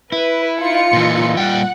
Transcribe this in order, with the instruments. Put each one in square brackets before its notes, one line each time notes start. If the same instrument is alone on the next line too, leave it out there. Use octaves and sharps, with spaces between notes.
[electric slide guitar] E4 [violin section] B4
[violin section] D#4 F4 C#7
[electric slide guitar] A#2 E3
[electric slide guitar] A#2 G3 G5 [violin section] F#5